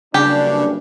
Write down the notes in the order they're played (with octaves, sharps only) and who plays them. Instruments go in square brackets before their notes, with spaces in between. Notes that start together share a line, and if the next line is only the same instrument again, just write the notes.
[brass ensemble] F#1 G2 C#4 [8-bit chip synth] C#3 [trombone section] D4 [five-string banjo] G4